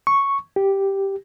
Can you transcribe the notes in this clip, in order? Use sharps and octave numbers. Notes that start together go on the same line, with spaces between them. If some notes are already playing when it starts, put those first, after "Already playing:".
C#6
G4